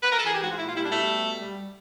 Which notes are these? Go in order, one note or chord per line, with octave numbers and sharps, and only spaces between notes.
B4
A#4
A4
E3 G#4
G4
G#2 F#4
F4
A#2 E4
F4
G3 E4
D4
B2 A3
B2
G3
G3